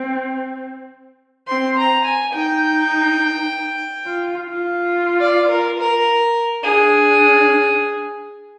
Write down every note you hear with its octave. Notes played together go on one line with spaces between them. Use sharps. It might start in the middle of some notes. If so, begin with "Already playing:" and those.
Already playing: C4
C4 C6
A#5
G#5
D#4 G5
F4
F4
D5
A#4
A#4
D4 G#4